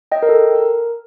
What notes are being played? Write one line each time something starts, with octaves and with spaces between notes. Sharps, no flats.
D#5 G5
A#4
A4
A#4